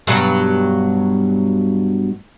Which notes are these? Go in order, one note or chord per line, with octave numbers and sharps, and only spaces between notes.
G2 B2 F#3